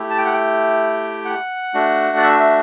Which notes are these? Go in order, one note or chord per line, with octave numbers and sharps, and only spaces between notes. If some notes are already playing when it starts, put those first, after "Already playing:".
Already playing: A3 E4 G4
A5
G5
F#5
G5
F#5
A3 D4 F#4
D5
E5
E5